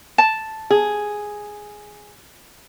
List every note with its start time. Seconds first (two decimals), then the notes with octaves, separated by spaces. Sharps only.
0.18 A5
0.70 G#4